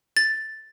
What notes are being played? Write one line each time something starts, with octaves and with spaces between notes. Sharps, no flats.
A6